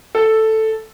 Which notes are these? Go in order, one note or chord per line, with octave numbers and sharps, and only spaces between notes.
A4